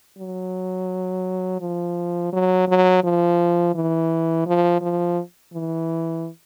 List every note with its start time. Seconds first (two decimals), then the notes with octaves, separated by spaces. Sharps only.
0.18 F#3
1.61 F3
2.33 F#3
2.68 F#3
3.04 F3
3.75 E3
4.46 F3
4.82 F3
5.53 E3